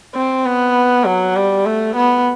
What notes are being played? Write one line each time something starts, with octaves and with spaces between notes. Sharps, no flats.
C4
B3
F#3
G3
A3
B3